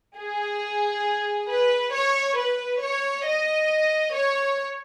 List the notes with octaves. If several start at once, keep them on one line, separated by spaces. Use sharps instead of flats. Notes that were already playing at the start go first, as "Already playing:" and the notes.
G#4
B4
C#5
B4
C#5
D#5
C#5